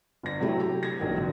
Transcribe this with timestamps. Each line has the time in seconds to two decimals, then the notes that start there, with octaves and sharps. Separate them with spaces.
0.23 G1 A#6
0.40 C3 F#3 A3 E4 G4
0.61 G4
0.83 G#6 A#6
1.00 A#1 D#3 F#3
1.18 D3